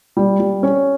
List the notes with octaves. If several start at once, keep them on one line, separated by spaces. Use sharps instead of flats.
G3
G3
C#4